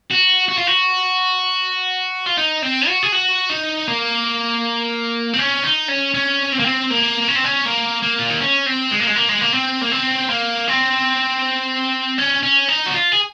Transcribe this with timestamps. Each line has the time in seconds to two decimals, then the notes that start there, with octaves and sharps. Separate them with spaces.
0.11 F#4
0.48 F#4
0.58 F4
0.67 F#4
2.26 F4
2.37 D#4
2.62 C4
2.88 F#4
3.03 G#4
3.13 F#4
3.50 D#4
3.88 A#3
5.34 C4
5.39 C#4
5.64 D#4
5.89 C#4
6.14 C#4
6.52 C4
6.59 A#3
6.66 C4
6.91 A#3
7.28 C#4
7.36 C4
7.45 C#4
7.66 A#3
8.03 A#3
8.19 F4
8.30 D#4
8.40 C#4
8.66 C4
8.91 G#3
9.00 A#3
9.07 G#3
9.16 A#3
9.29 G#3
9.41 A#3
9.54 C4
9.82 A#3
9.92 C4
10.30 A#3
10.68 C4
12.18 C#4
12.43 C#4
12.69 D#4
12.86 F#4
12.94 F4
13.12 G#4